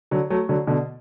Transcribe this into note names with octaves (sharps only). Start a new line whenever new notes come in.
D3 F#3
F#3 A3
D3 F#3
B2 D3